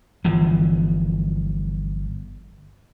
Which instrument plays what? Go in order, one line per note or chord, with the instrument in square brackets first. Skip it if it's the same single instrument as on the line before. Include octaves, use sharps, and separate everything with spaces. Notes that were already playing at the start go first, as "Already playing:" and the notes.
[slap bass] G1 E3 F3